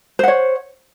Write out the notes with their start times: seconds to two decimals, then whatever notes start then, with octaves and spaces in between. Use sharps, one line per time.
0.19 C5
0.23 F#5
0.28 C#5